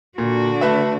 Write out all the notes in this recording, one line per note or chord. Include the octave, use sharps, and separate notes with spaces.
A#2 D3 F#4
A3 B4 E5